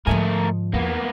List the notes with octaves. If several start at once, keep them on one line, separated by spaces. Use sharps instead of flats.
G#2 D3 F3 A3 A#4 D#5 G#5
E2 A#3 B3